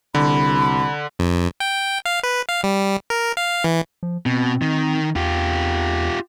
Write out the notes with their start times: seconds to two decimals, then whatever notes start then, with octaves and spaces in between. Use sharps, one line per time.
0.15 C2 D3 B5
1.19 F2
1.60 G5
2.05 F5
2.23 B4
2.49 F5
2.63 G3
3.10 A#4
3.37 F5
3.64 E3
4.03 F3
4.26 B2 C4
4.62 D#3
5.16 E2 F4 G4